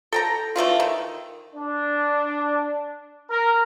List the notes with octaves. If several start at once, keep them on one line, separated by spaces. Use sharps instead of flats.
A4 G5 A#5
E3 A3 D4 F4
D#3
D4
A#4